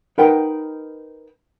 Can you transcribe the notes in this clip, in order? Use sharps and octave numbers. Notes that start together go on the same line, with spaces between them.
D#4 A#4 B4 F#5 G5